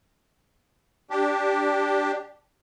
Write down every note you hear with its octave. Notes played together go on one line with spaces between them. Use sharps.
D4 G4